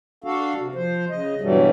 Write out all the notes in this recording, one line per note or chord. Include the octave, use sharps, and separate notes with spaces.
D4 F#4 A4 F5
C3
F3 C5
C#3 D#5
G2 B2 E3 F#3 G3 A3